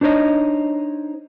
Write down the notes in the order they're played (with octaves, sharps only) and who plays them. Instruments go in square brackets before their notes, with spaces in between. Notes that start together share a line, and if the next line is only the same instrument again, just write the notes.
[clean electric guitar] D4 D#4 C5 C#5 D#5